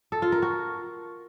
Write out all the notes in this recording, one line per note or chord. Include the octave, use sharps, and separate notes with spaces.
A4
F4
A#4
F#4